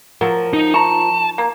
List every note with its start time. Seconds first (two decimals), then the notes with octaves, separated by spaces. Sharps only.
0.21 F3 F#3 F4 A#4
0.53 D#4
0.74 A5 A#5 C#6
1.38 A#3